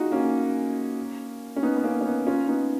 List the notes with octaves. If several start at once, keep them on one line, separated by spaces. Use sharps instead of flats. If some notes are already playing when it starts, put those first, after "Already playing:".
Already playing: D#4 F4 F#4 G#4
A#3 C#4
C#4
B3 D#4
B3
A#3 C#4
C#4
B3 D#4
C#4 F4
B3 D#4